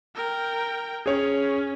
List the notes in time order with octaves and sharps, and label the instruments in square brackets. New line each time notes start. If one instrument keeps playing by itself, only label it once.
[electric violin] A#4 G5
[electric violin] C#4 [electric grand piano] G#4 C#5